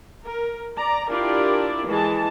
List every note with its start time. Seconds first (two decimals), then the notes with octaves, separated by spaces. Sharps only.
0.23 A#4
0.76 D5 A#5
1.08 D4 E4 F4 G4 A#4 D5
1.86 E3 G#3 A5